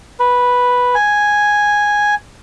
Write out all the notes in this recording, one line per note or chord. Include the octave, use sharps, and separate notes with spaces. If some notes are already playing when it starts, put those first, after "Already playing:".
B4
G#5